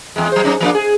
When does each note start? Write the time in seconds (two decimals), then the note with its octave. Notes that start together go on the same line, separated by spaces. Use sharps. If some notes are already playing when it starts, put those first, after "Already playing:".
0.16 E2 G#3
0.32 F#3 C5
0.44 F#3 C#4 D#4
0.61 F3 A#3 D4
0.75 G#4